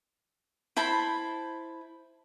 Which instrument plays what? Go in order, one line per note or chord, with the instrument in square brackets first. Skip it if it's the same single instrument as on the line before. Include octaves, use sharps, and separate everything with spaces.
[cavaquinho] E4 C5 A5 B5